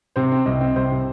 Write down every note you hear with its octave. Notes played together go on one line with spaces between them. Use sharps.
C3 C5
C4
C2 D#5
C4
C2 C5
C3